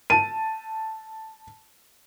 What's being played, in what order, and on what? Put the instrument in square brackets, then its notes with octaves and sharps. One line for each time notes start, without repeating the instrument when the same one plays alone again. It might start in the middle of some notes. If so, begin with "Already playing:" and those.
[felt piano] A5 D#7